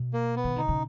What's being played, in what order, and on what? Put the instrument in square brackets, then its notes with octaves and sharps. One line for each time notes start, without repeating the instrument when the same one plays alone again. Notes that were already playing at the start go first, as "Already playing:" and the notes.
Already playing: [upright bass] B2
[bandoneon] A#3
B3
[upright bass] D#3
[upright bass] D3 [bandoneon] D#4
[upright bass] C#3